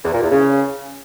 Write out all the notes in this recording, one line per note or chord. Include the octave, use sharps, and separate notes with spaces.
E2
A#2
E2
C#3